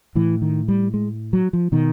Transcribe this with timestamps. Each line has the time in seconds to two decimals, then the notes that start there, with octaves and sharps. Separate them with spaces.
0.15 A2 E3
0.42 D#3
0.68 G3
0.94 G#3
1.33 F#3
1.53 F3
1.72 B2 D#3